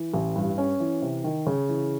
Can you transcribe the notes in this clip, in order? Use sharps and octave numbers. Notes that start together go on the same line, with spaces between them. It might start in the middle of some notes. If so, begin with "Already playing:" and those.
Already playing: E3
A1
G2
C#4
E3
C3
D#3
C#3
E3